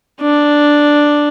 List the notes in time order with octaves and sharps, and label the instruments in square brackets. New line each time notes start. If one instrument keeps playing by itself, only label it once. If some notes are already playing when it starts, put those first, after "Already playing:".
[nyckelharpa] D4